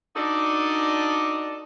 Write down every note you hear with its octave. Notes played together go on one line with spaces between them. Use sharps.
D4 D#4 F#4 A4 D5 D#5